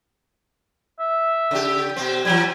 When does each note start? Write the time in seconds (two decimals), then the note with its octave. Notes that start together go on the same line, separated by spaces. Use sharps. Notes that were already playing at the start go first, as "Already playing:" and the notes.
0.99 E5
1.51 C#3 G4
1.96 B2 C4
2.25 E3 F#3 G3 G#5